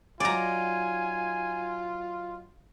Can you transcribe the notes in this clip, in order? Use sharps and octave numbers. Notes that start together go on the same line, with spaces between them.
F#3 D#4 F4 D5 G#5 A#5